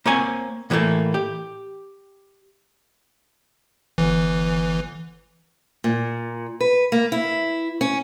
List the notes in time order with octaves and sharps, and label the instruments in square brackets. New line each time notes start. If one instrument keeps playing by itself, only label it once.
[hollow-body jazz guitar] A#3 C4 C#5 G#5
A2 E3 F#3 G3 A3 A#3
G4
[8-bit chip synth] G1 E3
[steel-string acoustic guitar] A#2
B4
A#3
E4
C#4